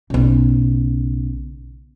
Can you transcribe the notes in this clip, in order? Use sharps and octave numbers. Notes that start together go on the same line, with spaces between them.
B1 C#3